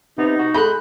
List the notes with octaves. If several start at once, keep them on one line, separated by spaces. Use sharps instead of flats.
C3 B3 D#4
F#4
G#3 G#4 A4 B5 F#6 G6